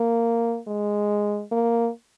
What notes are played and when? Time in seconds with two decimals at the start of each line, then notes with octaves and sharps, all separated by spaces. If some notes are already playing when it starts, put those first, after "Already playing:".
Already playing: A#3
0.67 G#3
1.52 A#3